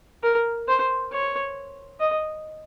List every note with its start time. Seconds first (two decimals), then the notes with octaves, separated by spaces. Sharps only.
0.23 A#4
0.68 C5
1.12 C#5
2.00 D#5